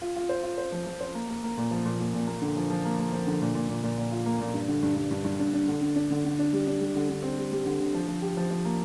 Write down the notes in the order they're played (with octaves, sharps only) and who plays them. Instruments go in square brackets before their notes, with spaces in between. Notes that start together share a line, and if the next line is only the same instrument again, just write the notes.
[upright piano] F4
F4
C5
F4
C5
F3
F3
C5
A#3
A#3
A#3
A#2
F3
A#2
A#2
A#2
A#3
D3
F3
F3
A#3
A#3
F3
D3
A#2
A#2
A#2
A#2
A#2
F4
A#3
A#2
G2
D3
G2
G2
G2
G2
D4
D4
D3
D3
D4
D3
D3
D4
G3
D4
G3
D3
D3
C4
G3
G3
D3
D3
F3
F3
G4
F3
F3
A#3